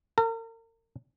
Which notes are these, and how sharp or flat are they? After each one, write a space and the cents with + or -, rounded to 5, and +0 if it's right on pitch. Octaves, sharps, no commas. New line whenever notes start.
A#4 -40